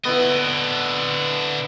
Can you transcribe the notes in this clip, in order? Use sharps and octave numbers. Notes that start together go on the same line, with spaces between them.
D3 B3 E4 D#5